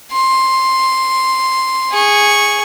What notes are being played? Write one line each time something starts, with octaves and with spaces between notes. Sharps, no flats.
C6
G#4 C#6